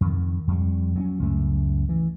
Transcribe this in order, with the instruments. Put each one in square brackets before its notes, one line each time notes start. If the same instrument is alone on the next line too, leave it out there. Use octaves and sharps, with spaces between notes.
[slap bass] F2 D#3
F2 G3
F#3 B3 C#4
C#2 F#2 A3
E3